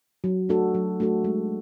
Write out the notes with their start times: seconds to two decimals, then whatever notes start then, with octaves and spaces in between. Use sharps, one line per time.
0.24 F#3
0.49 A3 D4 F#4 A4
0.74 F#3
1.00 A3 D4 F#4 A4
1.24 G#3